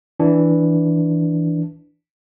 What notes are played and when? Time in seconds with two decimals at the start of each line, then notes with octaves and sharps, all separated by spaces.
0.20 E3 D4